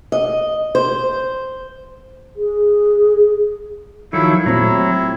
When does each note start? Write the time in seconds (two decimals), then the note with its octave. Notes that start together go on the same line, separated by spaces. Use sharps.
0.12 D#5
0.75 C5
2.36 G#4
4.13 D#3 F3 F#3 E4 A4
4.46 A#2 F#3 A3 C4 E4